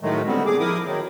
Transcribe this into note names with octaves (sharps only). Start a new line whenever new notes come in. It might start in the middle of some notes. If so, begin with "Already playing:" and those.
A2 D#3 F#3 G#3 A3
A#2 D3 G3 B3 C4
G#4 D6
F3 E4 A#4 D6 D#6
D#3 F#3